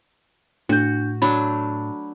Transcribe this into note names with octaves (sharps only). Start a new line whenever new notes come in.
A2 D4 F#4 G6
F#3 A3 D4 B5